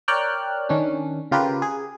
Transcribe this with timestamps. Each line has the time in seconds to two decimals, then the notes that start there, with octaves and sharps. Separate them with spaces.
0.08 A#4 C#5 D5 G5 F6 F#6
0.69 D#3 C#4 D4
1.31 C#3 F4 G4 A#4 B4
1.62 G#4